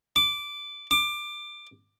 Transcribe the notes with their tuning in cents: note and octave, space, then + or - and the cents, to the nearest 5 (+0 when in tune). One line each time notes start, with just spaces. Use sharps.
D6 -10
D6 +15